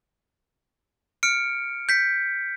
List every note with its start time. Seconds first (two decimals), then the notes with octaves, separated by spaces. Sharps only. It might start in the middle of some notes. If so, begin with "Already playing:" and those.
1.23 F6 C#7 D7
1.89 G6 B6 C#7